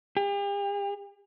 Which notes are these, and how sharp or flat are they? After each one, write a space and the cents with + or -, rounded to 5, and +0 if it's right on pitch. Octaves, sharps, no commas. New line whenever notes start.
G4 +45